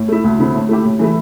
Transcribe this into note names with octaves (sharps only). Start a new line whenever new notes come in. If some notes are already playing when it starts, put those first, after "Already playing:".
Already playing: A2
A3 E4
D2
D3 C4 E4
A2
A3 E4 G4
A2
E3 A3 E4